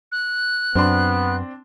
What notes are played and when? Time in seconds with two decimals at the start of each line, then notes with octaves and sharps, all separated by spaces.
0.12 F#6
0.75 F#2 B3 C4 D4 C6